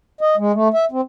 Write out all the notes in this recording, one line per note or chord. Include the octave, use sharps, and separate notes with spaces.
D#5
G#3
A3
E5
C4